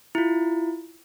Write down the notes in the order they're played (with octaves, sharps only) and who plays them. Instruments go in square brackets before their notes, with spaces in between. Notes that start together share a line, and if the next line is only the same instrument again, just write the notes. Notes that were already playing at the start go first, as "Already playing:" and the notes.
[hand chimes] E4 F4